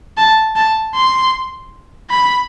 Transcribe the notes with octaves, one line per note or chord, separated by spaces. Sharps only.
A5
A5
C6
B5